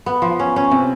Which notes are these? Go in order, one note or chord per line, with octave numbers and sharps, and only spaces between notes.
B3
F3
C#4
C#4
C3